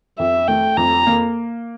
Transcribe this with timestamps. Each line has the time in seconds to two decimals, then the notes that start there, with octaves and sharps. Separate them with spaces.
0.19 F2 E5
0.48 A3 G5
0.77 F2 A#5
1.07 A#3